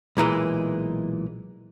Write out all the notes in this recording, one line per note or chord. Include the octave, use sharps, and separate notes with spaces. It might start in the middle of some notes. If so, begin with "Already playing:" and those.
B1 A#2 E3 G#3